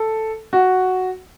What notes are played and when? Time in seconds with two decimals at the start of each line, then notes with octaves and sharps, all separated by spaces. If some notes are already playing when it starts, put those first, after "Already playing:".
Already playing: A4
0.53 F#4